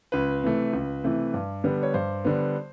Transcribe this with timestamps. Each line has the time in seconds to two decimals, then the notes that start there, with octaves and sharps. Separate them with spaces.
0.12 C#2 B4
0.43 C3 E3 A3
0.73 C#2
1.04 C3 E3 A3
1.34 G2
1.64 D3 G3 B3
1.83 C#5
1.94 G2 C5
2.25 D3 G3 B3